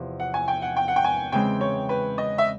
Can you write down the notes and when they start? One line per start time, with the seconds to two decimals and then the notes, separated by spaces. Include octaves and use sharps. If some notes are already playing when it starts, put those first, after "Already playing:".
Already playing: E2 C3 F3
0.20 F#5
0.34 G#5
0.48 G5
0.62 F#5
0.76 G5
0.88 F#5
0.96 G5
1.04 G#5
1.32 C#3 E3 G#3 C4 G5
1.61 C#5
1.89 B4
2.18 D#5
2.38 E5